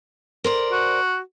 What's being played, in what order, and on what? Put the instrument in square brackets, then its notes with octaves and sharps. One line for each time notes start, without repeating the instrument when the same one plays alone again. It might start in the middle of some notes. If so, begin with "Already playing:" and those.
[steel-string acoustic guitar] A#4 C5 D5
[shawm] F#4